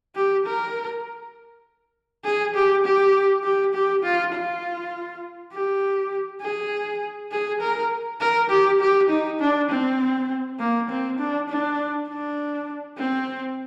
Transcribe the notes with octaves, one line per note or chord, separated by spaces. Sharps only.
G4
A#4
G#4
G4
G4
G4
G4
F4
F4
G4
G#4
G#4
A#4
A#4
G4
G4
D#4
D4
C4
A#3
C4
D4
D4
D4
C4